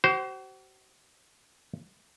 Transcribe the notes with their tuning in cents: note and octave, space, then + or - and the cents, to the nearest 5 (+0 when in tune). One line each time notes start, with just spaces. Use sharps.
F#4 +45 C5 +0